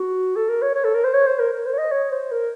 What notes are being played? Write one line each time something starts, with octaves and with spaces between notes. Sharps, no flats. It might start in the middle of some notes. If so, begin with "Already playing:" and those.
Already playing: F#4
A4
A#4
C#5
C#5
A4
A#4
C5
C#5
C5
A#4
A#4
C5
C#5
D#5
C#5
C5
A#4